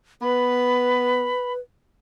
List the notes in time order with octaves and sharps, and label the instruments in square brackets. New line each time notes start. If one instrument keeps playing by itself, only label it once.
[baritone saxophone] B3 [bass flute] B4 [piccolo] B5